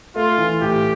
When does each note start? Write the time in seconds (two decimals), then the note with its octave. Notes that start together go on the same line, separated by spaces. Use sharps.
0.16 A3 F4
0.38 E3
0.61 A2 G4